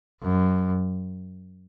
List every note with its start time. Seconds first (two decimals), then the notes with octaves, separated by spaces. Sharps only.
0.23 F#2